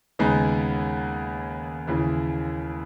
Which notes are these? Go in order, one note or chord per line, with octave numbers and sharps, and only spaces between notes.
D#2 C#3 G#3 B3 D#4
D#2 C#3 E3